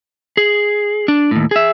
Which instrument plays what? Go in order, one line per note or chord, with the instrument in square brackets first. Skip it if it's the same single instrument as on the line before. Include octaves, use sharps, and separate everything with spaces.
[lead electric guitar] G#4
D4
D#2 A2
G#4 E5